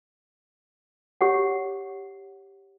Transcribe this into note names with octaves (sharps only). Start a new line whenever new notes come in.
G4 C#5 F#5